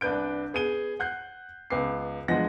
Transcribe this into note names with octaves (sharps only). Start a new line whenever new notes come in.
C2 D4 B4 G6 D7
B3 G#4 G#5 D#7 G7
F#5 F#6 G6 C7
C#2 B3 B4 G5 D6 C7
E2 G2 F3 G#3 F#5 A#6